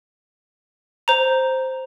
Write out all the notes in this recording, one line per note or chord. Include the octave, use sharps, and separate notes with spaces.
C5 A#5